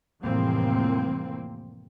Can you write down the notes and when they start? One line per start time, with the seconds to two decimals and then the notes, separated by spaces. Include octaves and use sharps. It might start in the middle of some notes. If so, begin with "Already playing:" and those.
0.22 F1 A2 E3 G3 A#3 C4